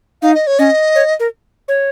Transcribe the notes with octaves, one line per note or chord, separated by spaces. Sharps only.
D#4 F5
D#5
C#5
C#4 D#5
C#5
A#4
C#5